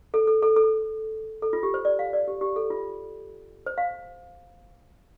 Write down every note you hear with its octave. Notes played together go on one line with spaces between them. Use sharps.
A4
A4
A4
A4
A4
F4
G4
C5
D5
F5
D5
G4
G4
A4
F4
C5
F5